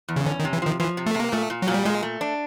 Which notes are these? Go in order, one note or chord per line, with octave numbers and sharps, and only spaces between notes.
E2
C#3
D3 C#4
D#3
C3
E3
D#3 F3
E3 F3
C3
A3
C3
A#3
A#2 A3
A#2
F#3
A#2
G3
A#2 G#3
A3
D4